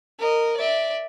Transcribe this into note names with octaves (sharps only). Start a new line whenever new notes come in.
A#4 D#5
D5 E5